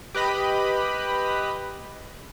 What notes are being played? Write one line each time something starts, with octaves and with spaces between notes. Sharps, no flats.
G4 B4 D#5 B5